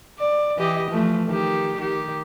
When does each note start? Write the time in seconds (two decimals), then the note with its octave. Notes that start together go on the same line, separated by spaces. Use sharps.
0.19 D5
0.57 E3 G4 D#5
0.90 E3 F3 A3
1.27 D#3 G4
1.77 D#3 G4